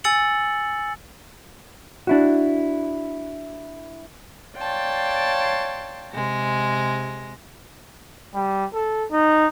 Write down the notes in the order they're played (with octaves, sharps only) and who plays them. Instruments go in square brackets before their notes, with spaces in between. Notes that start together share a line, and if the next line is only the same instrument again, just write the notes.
[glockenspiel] G#5 E6 A6 C#7 F#7
[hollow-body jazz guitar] D4 E4 F#4
[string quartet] C#5 D5 F5 G5 A5 C6
C3 G#3 A#6
[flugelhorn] G3
A4
D#4